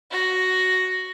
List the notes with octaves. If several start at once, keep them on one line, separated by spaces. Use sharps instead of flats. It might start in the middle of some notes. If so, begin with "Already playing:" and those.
F#4 A#6